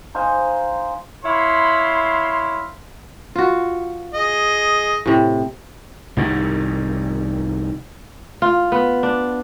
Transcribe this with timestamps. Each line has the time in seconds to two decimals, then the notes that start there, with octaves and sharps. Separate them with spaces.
0.15 D#4 C5 F5 G#5
1.25 E4 C#5 F5 B5 C6
3.36 F4 F#4
4.14 G#4 D#5
5.06 A2 C3
6.17 C2 G#2 D#3
8.42 F4
8.72 B3
9.03 D4